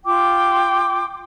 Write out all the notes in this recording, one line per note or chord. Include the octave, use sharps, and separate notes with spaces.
F4 G5 D6